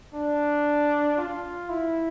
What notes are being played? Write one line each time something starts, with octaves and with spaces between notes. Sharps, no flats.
D4
F4
E4